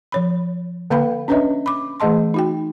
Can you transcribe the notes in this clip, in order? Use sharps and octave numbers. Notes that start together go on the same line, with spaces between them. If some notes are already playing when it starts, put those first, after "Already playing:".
F3 C#5 B5
D3 A#3 B4 F5 G5 B5
C#4 D4 B4 C#5 D#5 E5
B5 D6
E3 A3 G#4 D#5 A5 C6
D#4 F#4 G5